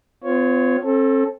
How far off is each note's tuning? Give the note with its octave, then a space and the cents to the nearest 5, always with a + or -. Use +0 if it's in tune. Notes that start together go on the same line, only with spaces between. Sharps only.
C4 -45 F4 +0 C#5 +0
C4 +40 A4 +0